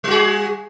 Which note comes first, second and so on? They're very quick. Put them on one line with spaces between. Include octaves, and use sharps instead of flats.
G3 F#4 G#4